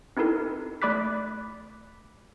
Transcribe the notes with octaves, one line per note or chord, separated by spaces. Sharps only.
C4 D#4 E4 A4 A#4
A3 D5 B5 D6 F#6 B6